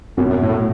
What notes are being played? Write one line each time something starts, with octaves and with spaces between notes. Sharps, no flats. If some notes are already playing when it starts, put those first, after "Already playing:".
F#2 B2 F#3 B3
F#2
A2